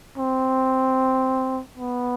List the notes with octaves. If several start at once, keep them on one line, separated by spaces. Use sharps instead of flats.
C4
B3